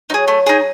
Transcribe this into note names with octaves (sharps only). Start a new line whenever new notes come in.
F#3 D#4 G#4
A3
D#4 G#4